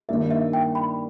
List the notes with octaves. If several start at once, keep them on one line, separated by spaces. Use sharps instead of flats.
G2 D#3 A#3 E5
E5
G5
B5